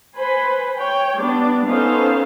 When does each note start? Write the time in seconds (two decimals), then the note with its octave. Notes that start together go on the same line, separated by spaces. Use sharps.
0.15 B4 C5 G#5 B5
0.77 C#5 G5
1.18 G3 B3 D4
1.65 B3 C#4 D#4 A4 C5 F5